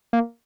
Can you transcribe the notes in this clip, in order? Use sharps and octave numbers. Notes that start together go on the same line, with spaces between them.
A#3